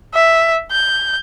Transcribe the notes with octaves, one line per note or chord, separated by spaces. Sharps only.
E5
G6